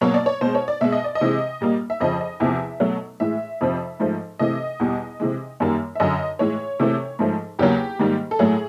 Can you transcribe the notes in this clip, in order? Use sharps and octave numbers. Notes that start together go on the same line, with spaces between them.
B2 F#3 A#3 C#5
D5
C#5
B2 G#3 C5
C#5
D5
B2 G#3 E5
D#5
D5
D#5
C3 E3 G#3
A#2 G3 A#3
E5
F2 C#3 F3 D#5
D#5
E2 C3 F3 E5
B2 F#3 A3
A2 E3 G#3 E5
F2 C3 F3
G#2 F3 A3
C3 E3 A3 D#5
E2 B2 G3
C3 E3 G#3
F#2 D#3 G3 A#3
E5
F#2 D3 F#3 D#5
A2 E3 G#3 C#5
C3 E3 A3
G#2 F3 A3
E2 C#3 F#3 A#3 G4
G#2 D#3 G3 A#3
A4
A2 F#3 A3 G#4